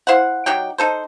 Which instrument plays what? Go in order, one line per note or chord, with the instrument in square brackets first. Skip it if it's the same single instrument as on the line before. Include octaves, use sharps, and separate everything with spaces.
[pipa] E4 C5 F5 F#5
F#3 D#4 G4 G5
D#4 A4 C5